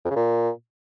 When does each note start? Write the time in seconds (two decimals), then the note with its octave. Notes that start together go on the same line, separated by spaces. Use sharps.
0.05 F2
0.10 C#3
0.16 A#2